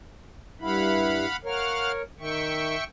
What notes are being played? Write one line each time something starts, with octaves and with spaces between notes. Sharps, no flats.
G2 E4 F5 F#5 B5
A#4 C#5 F5 F#5 F6
D#3 E5 G5 C#6